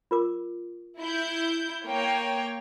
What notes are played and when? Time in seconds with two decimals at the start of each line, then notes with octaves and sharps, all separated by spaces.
0.11 F4 A#4 D6
0.99 E4 G6
1.86 A#3 C#5 G5